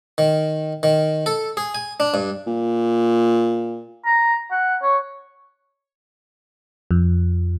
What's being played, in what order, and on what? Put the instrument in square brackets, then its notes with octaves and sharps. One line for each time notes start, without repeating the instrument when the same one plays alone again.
[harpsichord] D#3
D#3
A4
G#4
G#5
D4
G2
[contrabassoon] A#2
[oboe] A#5
F#5
C#5
[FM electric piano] F2